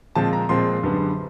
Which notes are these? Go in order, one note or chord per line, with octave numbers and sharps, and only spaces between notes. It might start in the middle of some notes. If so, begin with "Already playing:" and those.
A#2 F3 G#3 C4 A5
A#5
A#2 F3 G#3 C4 C6
F#2 D3 G3 B3